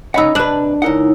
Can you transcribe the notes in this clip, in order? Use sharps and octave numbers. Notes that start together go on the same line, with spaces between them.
C#2 C#4 D#4 D#5 F#5 B5 E6
C2 D4 B4 A5 F#6 F#7
C#2 D#4 E4 A#4 C#5 F#5